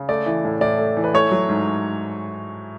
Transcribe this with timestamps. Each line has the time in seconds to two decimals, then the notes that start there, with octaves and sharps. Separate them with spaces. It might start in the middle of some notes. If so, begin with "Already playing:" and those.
Already playing: C#3
0.09 A3 D5
0.26 E3
0.45 A2
0.61 A2 D5
0.78 A3
0.97 E3
1.04 B4
1.14 A3 C#5
1.31 F#3
1.49 G#2